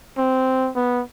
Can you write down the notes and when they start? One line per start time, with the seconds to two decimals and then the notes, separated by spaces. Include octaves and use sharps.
0.18 C4
0.76 B3